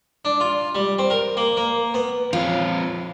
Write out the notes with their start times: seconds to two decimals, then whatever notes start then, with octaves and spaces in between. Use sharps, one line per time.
0.25 D4
0.40 F4
0.75 G3
0.98 C4
1.10 A#4
1.37 A#3
1.57 A#3
1.94 B3
2.33 F3 C4 F4 C#5